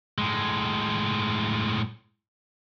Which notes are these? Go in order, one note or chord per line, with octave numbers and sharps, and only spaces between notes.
A2 G#3